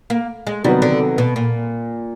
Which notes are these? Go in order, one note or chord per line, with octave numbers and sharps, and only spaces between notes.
A#3
G#3
C3 D#3 F#3 G3 B3
D3
B2
A#2